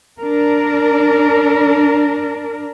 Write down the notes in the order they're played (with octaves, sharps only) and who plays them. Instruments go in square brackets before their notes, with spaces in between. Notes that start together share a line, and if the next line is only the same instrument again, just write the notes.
[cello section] D4 A#4